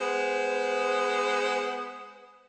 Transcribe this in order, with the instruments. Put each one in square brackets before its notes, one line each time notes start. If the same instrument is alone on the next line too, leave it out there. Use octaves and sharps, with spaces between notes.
[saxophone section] G#3 B3 B4 C5